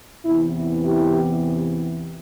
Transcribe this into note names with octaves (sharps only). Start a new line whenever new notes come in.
E2 C3 E3 B3 E4
E4 G4